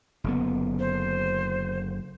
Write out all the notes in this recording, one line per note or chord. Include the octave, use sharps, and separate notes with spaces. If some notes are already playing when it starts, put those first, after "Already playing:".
F#1 D3 B3
C5